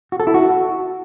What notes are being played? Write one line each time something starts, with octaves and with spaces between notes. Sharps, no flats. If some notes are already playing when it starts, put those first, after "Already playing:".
F#4
A4
E4
F#4